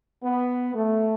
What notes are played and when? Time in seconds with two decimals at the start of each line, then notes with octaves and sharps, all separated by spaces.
0.23 B3
0.75 A3